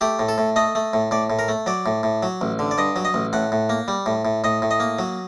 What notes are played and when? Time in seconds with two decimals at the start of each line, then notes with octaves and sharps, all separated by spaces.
0.01 A3 G4
0.19 A2
0.29 A4
0.38 A2
0.56 A3 D#5
0.75 A3
0.93 A2
1.11 A2 D5
1.30 A2
1.39 A#4
1.48 A3
1.66 F#3 D5
1.86 A2
2.03 A2
2.23 F#3
2.41 A1
2.59 D3
2.71 D5
2.78 G2 D#5
2.96 F#3
3.05 D#5
3.14 A1
3.33 A2 F#5
3.52 A2
3.70 A#3
3.88 G3
4.06 A2
4.25 A2
4.44 A2 D#5
4.62 A2
4.71 D#5
4.80 A#3
4.99 F#3